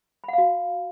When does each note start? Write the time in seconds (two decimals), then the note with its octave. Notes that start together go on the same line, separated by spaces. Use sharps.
0.24 B5
0.28 F#5
0.33 F5
0.38 F#4